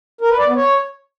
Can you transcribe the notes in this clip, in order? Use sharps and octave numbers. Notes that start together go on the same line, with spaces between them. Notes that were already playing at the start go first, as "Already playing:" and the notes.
A#4
B4
D5
B3
C#5